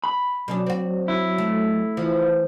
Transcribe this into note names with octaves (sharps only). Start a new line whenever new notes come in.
B5
B2 F#3 C#4 D4
C4 F#4
E4
A3
E3 F3